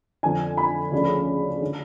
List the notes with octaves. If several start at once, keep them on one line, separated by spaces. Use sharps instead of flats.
F2 D3 F3 G#5
B5
D2 C#3 F3 A3 D4
D3